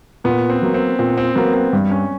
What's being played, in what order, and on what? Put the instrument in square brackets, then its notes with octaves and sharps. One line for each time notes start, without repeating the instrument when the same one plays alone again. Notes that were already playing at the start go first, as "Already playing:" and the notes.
[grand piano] A#2 [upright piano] B3
[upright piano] C4
[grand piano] F#3 A#3
[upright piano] C4
[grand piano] A#2 [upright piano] C4
[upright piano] C4
[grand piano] F#3 A#3 [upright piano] B3
[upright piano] C4
[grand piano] G2
[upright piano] C#4